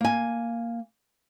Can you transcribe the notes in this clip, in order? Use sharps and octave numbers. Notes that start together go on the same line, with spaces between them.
A#3 G#5